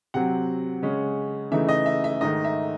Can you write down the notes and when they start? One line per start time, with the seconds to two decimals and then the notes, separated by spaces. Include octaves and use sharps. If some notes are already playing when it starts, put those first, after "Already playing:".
0.14 C3 F#3 C4 F#5
0.82 C#3 G#3 C#4
1.51 C#3 E3 A3 D#4 E5
1.69 D#5
1.86 E5
2.04 E5
2.21 G#2 D#3 A3 D#4 D#5
2.44 E5